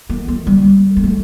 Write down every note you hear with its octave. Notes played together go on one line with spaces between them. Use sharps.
A#3
A#3
G3
A#3
A3